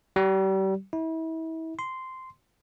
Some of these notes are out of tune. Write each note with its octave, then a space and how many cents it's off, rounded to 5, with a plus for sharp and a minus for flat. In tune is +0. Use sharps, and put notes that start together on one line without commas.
G3 -35
E4 -35
C6 -10